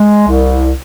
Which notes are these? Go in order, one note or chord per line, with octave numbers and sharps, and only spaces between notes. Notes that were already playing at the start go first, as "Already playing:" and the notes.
Already playing: G#3
C2